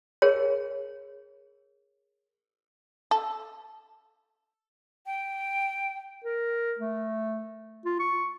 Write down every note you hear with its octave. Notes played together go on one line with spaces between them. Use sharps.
G#4 A#4 C#5
A4
G5
A#4
A3
F4
C#6